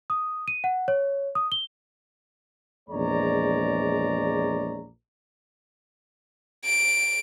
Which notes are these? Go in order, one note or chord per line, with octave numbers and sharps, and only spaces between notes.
D#6
D#7
F#5
C#5
D#6
G7
A#1 E2 G#3 C#5 D5 A#5
D7